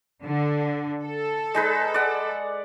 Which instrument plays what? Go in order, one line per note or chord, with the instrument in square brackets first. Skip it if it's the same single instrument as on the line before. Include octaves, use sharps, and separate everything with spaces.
[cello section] D3
A4
[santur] G#3 D#4 B4
D5 F#5